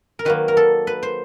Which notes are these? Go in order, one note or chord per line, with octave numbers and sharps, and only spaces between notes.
A#4
D#3 F#3 A#3 B4
A#4
A4
B4
C5